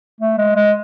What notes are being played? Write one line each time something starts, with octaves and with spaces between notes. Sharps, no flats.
A3
G#3
G#3